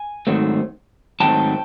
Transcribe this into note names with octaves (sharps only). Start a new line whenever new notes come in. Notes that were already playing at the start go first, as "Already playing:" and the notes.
Already playing: G#5
G#2 D#3 F#3 A3 C4
G#2 D#3 F#3 A3 C4 G5 A5